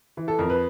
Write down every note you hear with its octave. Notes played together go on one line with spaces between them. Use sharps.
E3
A4
F2 A#4
B4